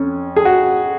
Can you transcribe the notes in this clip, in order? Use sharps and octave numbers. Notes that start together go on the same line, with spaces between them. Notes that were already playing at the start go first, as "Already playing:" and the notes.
Already playing: F2 C#4
G#4
F#4